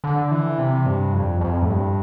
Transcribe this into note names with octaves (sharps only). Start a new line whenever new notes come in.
D3
E3
C3
G2
F2
F2
A2
G2